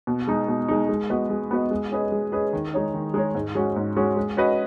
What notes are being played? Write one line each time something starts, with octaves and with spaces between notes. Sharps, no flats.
B2
G#3 D#4
B2
G#3 D#4
G#3
B3 F#4 B4 D#5
G#3
B3 F#4 B4 D#5
G#3
C#4 G#4 B4 D#5
G#3
C#4 G#4 B4 D#5
D#3
G#3 D#4 G#4 C#5
D#3
G#3 D#4 G#4 C#5
G#2
G#3 C#4 F#4
G#2
G#3 C#4 F#4
G#3
C#4 F#4 B4 D#5